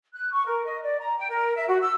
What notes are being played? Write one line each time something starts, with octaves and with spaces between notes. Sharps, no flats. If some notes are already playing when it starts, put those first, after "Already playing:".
F#6
C#6
A#4
D#5
D5
A#5
G5
A#4
E5
F#4
E6